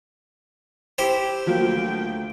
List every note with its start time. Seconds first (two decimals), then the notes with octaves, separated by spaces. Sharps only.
0.98 E4 G4 C5
1.47 D2 F3 F#3 A#3 G5